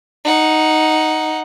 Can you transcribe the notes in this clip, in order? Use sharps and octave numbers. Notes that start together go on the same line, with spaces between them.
D#4 F#5